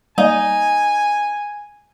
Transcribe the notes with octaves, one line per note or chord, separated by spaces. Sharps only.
G3 A#3 D#4 G#5